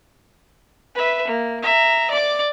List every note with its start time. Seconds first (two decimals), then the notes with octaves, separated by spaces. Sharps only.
0.95 B4 E5
1.27 A#3
1.63 E5 A#5
2.10 D5 D6